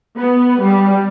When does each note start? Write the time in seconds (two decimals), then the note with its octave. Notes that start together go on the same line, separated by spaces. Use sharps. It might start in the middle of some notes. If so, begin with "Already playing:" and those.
0.17 B3
0.62 G3